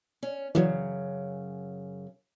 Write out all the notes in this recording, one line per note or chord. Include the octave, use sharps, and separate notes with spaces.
C#4
F#2 C#3 E3 F#3